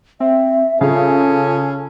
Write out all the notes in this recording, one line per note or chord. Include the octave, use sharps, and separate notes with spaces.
C4 E5
C#3 C#4 F4 A4 F5 G#5